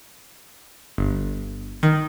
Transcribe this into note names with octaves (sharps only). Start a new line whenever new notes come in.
G1
D#3